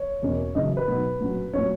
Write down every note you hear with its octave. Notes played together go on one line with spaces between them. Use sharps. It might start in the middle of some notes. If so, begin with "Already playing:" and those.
Already playing: C#5
E2 B2 A#3 C#4
F#2 C#3 E3 D#5
B4
B2 F#3 B3 D#4
A#2 F#3 C#4
A#2 F#3 C#4 C#5